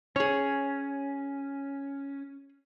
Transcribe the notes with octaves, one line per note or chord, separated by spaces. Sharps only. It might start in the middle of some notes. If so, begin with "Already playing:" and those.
C#4 G#4 C#5